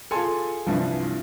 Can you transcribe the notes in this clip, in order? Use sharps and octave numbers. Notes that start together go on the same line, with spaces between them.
F4 G#4 A4 G#5 C6
C2 G2 E3 F3